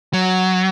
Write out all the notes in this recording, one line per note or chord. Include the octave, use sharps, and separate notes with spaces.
F#3